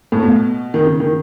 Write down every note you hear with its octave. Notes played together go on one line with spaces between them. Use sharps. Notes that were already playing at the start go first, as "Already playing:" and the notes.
A2
B2
D#3
C#3
D#3